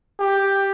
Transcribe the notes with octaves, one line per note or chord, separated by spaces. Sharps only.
G4